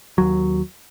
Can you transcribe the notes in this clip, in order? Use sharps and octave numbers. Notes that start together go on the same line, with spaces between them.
D#2 F#3